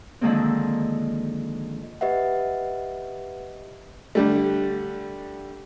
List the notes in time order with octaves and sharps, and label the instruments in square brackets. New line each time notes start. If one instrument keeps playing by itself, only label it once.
[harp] D3 D#3 F3 G#3 A#3 C4
[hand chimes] G4 B4 D#5 E5 F#5
[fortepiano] D3 G3 A3